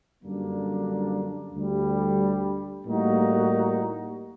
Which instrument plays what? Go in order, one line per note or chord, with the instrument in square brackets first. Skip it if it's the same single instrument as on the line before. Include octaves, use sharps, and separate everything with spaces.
[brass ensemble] F#2 D3 G3 A#3 D4
D2 D3 G3
A2 G3 A#3 D#4 F#4